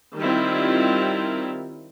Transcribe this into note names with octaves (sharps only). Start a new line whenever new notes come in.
D#3 G3 C4 E4 F4